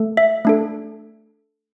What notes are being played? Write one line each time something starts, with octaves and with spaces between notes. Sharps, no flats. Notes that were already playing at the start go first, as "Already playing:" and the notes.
Already playing: A3 A4
E5
A3 D4 A4